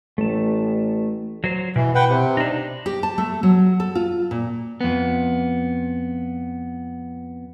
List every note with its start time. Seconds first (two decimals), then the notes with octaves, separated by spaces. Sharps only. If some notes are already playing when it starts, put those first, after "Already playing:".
0.18 A1 A3 A5
1.44 F#3 C5
1.76 B2 E3
1.95 B4 F#5 G5
2.09 C3
2.37 D4 D#4
2.86 G4
3.03 A5
3.18 A3
3.43 F#3
3.80 A4
3.95 F4
4.31 A#2
4.81 F2 B3